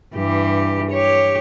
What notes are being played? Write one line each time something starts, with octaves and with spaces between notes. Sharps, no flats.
G2 E3 G4
G4 C#5